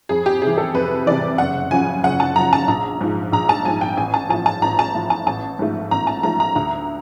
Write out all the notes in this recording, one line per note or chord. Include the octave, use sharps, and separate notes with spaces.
F2 G#4
G4
C3 E3 G#4
A4
F2 B4
C3 E3 D5
F#1 F#5
F#2 C#3 F3 G#5
F#1 F#5
A5
F#2 C#3 F3 A#5
A5
A#1 A#5
G#2 F3
A#1 A#5
A5
G#2 F3 G#5
G5
A1 G#5
A5
A2 F3 A5
A5
A1 A#5
A5
A2 F3
A5
A1 A5
G#2 F3 A3
A1 A#5
A5
G#2 F3 A3 A#5
A#5
D2 A#5